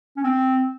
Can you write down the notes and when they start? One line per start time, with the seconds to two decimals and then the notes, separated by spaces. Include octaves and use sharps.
0.17 C#4
0.24 C4